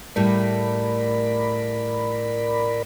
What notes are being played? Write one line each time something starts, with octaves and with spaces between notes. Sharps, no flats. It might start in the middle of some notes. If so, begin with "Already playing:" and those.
A2 G3 A3 A#4 D5 B5